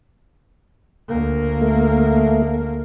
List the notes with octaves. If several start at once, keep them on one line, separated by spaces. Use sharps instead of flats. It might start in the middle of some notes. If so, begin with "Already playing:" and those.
D2 A#3
A3